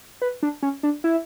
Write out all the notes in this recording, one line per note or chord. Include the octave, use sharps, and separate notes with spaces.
B4
D4
C#4
D4
E4